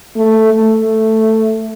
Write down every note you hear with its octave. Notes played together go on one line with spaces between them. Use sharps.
A3
A3